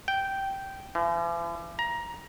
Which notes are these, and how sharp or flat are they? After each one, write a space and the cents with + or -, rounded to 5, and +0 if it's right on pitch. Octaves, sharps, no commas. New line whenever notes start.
G5 -10
E3 +45
A#5 +20